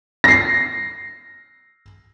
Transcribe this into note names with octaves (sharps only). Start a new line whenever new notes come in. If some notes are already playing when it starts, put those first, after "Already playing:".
A#6 C7